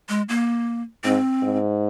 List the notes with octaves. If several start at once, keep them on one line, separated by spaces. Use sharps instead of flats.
G#3
A#3
G#2 C4
G#2